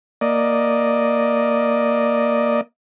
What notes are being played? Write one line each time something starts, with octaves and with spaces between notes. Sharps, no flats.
A#3 D5 D#5